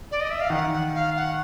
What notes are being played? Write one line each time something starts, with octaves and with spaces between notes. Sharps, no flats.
D5
D#5
E5
F5
D#3 F#5
F#5
F5
F#5